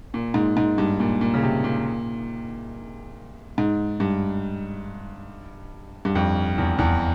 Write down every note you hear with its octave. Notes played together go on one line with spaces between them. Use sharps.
A#2
G#2
G#2
G2
A#2
A#2
C#3
C3
A#2
G#2
G2
G2
F2
E2
E2